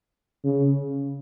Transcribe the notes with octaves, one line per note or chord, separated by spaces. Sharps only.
C#3